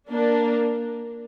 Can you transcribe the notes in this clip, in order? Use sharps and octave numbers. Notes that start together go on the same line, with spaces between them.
A#3 D4